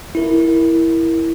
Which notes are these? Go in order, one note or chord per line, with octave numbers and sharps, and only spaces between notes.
E4 A#4